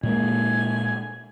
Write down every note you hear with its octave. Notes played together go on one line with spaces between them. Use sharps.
A#2 G#3 A#3 G#5